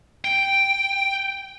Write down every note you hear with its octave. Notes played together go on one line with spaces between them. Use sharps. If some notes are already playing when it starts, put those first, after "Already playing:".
G5